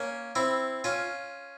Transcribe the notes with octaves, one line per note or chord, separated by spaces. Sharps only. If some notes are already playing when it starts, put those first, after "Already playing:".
Already playing: A#3 C#4
C4 E4
C#4 F4